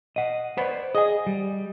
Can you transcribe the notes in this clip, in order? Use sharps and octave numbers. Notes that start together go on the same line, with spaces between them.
D#5 F#5
B3 C5 D5
G#4 D#5 G#5
G3